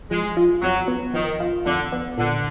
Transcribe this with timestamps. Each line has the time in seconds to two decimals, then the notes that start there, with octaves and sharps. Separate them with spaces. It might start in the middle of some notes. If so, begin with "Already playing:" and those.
0.11 F3 G#3
0.37 F4
0.62 F2 F#3
0.88 B3
1.14 D#3 F3
1.40 F4
1.66 F2 D3
1.92 B3
2.18 A#2 D3